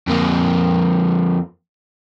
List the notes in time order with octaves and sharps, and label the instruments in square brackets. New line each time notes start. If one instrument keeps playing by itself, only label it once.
[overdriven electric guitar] F2 A#3